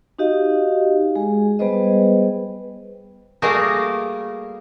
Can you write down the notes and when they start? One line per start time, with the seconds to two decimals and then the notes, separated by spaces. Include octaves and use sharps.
0.19 D#4 F#4 G4 D#5 F5
1.16 G#3 G#4
1.59 G3 B3 G#4 B4 C5 D#5
3.42 G3 A3 A#3 F#4 G#4 A#4